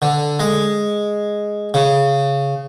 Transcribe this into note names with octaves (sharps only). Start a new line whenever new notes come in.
D3
G#3
C#3